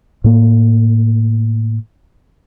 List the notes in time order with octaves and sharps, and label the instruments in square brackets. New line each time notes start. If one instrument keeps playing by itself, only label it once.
[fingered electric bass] A2 A#3